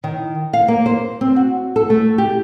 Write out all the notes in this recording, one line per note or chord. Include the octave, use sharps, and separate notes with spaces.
D#3
F5
A#3
C5
C4
F#4
A4
A3
G4